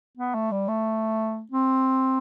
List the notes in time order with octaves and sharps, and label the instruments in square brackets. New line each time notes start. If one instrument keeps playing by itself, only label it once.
[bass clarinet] B3
A3
G3
A3
C4